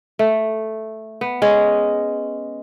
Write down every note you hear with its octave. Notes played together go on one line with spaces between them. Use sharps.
A3
B3
G#3 C#4 G#4